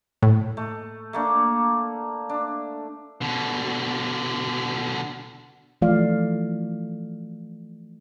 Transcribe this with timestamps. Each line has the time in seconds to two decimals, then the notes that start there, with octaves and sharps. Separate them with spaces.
0.22 A2
0.57 A3
1.13 A3 A#3 D4
2.29 D4
3.21 B2 D3
5.81 E3 F3 A3 F4 D5 F5